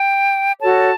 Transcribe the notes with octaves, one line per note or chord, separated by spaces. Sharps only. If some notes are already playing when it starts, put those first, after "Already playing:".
Already playing: G5
F#4 A4 C#5 A5